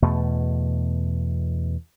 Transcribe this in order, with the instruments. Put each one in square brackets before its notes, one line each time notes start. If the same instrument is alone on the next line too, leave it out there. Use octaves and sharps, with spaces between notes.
[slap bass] E2 B2 A3